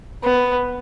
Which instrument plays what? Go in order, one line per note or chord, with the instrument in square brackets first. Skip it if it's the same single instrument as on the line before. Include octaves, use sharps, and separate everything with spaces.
[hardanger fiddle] B3